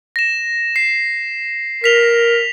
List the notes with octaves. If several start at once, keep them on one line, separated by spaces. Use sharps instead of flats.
A#6 E7
C7
A#4 B6 F7 G7